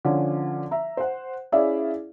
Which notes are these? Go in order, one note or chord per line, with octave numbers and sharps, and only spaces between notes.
D3 F3 C#4
E5 A#5
C5 F#5
C#4 E4 G#4 D5 E5 F5